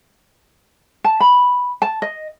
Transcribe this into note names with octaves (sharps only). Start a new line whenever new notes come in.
A5
B5
A5
D#5